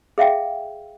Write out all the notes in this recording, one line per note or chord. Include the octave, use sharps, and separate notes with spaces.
G#4 E5 F5 G5